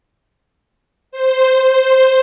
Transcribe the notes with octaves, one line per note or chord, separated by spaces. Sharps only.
C5
C5